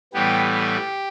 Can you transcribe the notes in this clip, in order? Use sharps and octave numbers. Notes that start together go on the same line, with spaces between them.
A2 E3 G3 B3 G4
G4